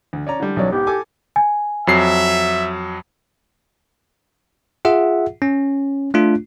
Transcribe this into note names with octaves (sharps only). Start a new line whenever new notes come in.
D2
C#4 D5 A#5
D3 G3
B1 F#3 C#4 D5
G#2 B3 G4
A4 G#5 D6
G#5
F2 F#3 E5 C7
F4 G#4 E5 F#5
C#4
A3 D4 F4